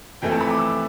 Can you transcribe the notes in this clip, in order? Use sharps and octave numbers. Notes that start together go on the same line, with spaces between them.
F2 E3 A3 G5
A5
B5
D6
E6